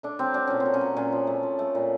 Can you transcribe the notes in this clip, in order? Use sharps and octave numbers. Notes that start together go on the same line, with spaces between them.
A3 D4
F#3 C4
F#3 D4
A#2 C#4
C4
F#3
C#4
F#3
A#2 C#4
F3
A3
F3
A3
A#2